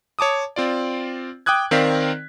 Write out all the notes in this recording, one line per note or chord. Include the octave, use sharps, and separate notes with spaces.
C#5 A5 D6 D#6
C4 F4 D5
G5 D6 D#6 F#6 G#6
D#3 C4 A#4 D5 F5 B6